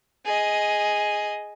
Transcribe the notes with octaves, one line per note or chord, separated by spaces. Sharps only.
G#4 D#5